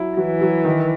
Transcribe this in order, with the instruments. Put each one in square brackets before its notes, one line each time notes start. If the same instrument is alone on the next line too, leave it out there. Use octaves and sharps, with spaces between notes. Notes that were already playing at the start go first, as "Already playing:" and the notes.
Already playing: [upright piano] F#3 E4
[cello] E3 [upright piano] F#3
[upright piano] F#3
D#3